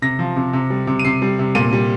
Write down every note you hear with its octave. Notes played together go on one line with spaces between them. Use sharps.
C3 A#6
F3
C3
C3
G3
C3
D#7
C3 C7
G3
C3
A#2 D#7
G3